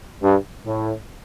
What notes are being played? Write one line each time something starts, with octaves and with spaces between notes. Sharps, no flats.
G2
A2